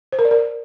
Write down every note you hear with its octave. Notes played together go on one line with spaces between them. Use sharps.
C5
A#4
D5
A#4